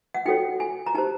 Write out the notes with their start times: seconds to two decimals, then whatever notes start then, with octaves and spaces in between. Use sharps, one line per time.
0.14 F#5
0.25 D#4 F#4 A4 C#5 G5
0.60 G#5
0.86 A#5
0.95 D#4 G4 C5 A5